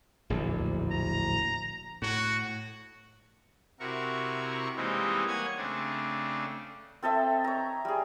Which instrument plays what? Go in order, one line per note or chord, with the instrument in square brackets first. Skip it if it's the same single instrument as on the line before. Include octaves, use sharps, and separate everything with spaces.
[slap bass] D1 A#1 E2
[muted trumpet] A#5
[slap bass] A2 [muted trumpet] F#4
[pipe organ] C3 E4 F#4 A#4 C#6
E3 G3 G#3 A#3 C4 D#4
A#3 C#5 F#5 G#5 G#6
C#3 A3 C4 D4
[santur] C4 A4 D#5 E5
C#5 A#5
G3 G#4